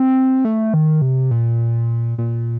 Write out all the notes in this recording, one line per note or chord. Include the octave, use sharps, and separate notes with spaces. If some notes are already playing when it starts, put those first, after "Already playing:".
Already playing: C4
A3
D#3
C3
A#2
A#2